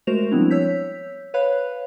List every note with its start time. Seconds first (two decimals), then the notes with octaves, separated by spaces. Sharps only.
0.07 G#3 A3 F#4 A#4 C5 F7
0.31 F3 G3 B3 C4 D4 E4
0.51 C#5 E6 G6 B6
1.34 B4 C#5 F5 B5 F#6